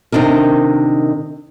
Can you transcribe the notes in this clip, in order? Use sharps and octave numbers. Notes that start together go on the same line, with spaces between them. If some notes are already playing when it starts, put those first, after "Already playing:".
C3 D#3 D4 D#4 A#4